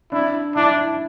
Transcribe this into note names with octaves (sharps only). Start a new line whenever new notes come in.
D4 E4
D4 E4